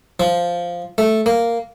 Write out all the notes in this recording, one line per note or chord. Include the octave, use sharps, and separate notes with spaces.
F3
A3
A#3